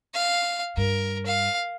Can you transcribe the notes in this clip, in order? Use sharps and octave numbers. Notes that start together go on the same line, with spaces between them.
F5
G2 A#4
F5